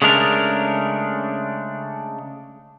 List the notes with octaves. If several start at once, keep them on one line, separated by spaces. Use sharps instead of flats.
C#3 G#3 A3 D4 A#4